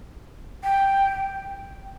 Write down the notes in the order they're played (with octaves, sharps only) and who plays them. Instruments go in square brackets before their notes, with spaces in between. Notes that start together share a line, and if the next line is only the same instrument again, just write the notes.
[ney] G5